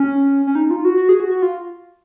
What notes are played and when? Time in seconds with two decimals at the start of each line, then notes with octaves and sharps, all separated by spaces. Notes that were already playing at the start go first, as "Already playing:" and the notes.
Already playing: C#4
0.47 C#4
0.55 D#4
0.71 F4
0.85 F#4
0.97 F#4
1.09 G#4
1.20 F#4
1.31 F#4
1.42 F4